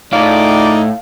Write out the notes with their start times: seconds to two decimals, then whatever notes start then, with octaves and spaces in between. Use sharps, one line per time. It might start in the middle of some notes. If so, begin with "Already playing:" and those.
0.13 A2 D#4 F4 G#4 D5 F5